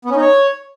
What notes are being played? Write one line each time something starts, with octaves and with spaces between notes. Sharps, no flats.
B3
C#4
D#4
C#5